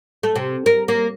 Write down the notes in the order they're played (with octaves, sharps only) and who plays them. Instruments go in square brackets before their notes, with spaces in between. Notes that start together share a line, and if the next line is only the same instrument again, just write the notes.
[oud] A3
C3
A#4
A#3